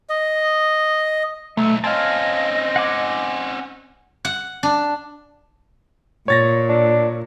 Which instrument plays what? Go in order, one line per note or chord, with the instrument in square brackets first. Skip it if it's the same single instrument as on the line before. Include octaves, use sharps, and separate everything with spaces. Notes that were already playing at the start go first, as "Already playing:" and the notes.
[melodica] D#5
[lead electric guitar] B1 [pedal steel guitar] A3 [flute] E6
[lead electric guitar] C4 C#4 [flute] D#5 [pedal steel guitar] F5 G#5 A5
[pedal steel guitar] F#5 G#5 D6
[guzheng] F#5
D4
[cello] A#2 [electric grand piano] C#5 A6 A#6
[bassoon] D4